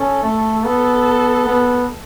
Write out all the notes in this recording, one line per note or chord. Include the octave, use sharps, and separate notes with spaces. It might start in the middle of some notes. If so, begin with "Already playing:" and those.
Already playing: C#4 A4
A3
B3 A4
B3